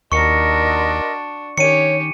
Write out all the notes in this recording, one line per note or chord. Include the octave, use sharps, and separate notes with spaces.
D#2 D4 F#4 A#4 D#5 C6 C#6 C#7
D#3 C#4 G4 C#5 C#7 D#7